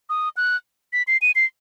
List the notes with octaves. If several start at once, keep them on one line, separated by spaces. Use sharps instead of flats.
D#6
F#6
B6
C7
D#7
C7